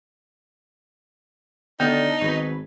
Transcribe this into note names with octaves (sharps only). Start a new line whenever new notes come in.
D3 D#3 B3 D4 D#4 F#4
G#1 F#3 B4